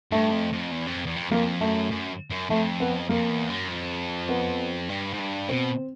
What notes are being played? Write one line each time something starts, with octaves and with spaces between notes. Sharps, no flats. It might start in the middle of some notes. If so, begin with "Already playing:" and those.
G2 A3
F2
F2
E2
F2
E2
F2
F2 A#3
F#2 A3
F#2
F#2
F2 A3
B3
F2 A#3
E2
F#2
F2
B3
G2
G#2
G2
B2 C4